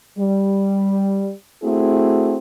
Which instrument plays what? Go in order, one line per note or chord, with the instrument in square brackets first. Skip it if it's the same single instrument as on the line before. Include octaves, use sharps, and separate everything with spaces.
[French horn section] G3
A3 C4 E4 F#4 G#4